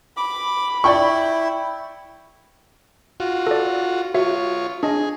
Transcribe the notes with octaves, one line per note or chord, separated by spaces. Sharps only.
B5 D6
E4 D5 G5 C#6
F4 F#4
A4 D5
F4 F#4 C#5 E5
D4 G#4 D#5